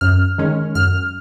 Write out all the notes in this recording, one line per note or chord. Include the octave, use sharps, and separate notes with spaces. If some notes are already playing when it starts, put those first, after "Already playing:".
F#2 F6
D#3 G#3 C#4
F#2 F6